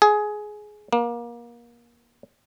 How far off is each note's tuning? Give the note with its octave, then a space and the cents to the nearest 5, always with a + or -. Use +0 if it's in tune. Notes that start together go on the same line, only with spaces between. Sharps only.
G#4 +15
A#3 +25